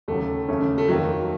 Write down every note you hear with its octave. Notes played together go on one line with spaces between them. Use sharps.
D#2 C#3 F#3 A3
D#2 C#3 A3 C#4
A3
F2 D#3 F#3 A#3